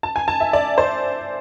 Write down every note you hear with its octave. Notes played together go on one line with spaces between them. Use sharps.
A5
G#5
A5
E5
D5
C5